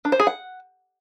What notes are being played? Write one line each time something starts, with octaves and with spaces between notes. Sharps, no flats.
D4
C5
G#4
F#5